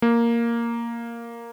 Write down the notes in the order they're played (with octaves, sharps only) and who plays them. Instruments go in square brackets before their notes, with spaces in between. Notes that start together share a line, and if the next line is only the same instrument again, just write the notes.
[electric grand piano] A#3